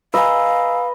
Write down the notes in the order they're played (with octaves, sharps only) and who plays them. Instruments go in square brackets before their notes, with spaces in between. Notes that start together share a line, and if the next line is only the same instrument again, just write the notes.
[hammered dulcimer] B4 D#5 [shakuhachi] F5 [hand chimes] G#5 A#5 E6